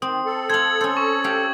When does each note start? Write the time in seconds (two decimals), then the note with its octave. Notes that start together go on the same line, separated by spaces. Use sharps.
0.02 D#3 C4 D#6
0.26 A4
0.50 C5 F5 G#6 F#7
0.81 C#4 C5
0.97 C#6
1.24 G4 F5